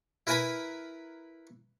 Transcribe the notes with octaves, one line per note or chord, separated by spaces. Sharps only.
E4 A#4 B4 G#5 A#5 B5